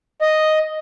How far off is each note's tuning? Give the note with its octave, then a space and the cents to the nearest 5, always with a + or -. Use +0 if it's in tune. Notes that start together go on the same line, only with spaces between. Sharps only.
D#5 +0